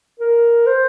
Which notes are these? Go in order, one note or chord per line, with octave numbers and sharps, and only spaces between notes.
A#4
C5